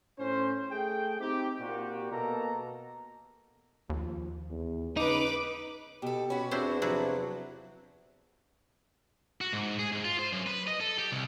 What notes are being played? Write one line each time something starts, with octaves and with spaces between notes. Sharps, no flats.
A2 C#4 C5
A3 G#4 G5
C4 D#4 G4
A#2 A#3 F#4 G4
B2 A#3 A4 A#5
D#2 F3
E2
C#3 D#4 B4 D6
B2 G4 A4
C#4 F#4 B5
E2 C4 D4 E4 F#4 C5
C3 F3 F#3 D4 E4 F#4
F#4
G#2
G#4
G#2
F4
C5
F#2
B4
D#5
A4
G4
C2